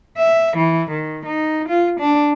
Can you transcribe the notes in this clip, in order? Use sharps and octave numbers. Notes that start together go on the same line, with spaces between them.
E5
E3
D#3
D#4
F4
D4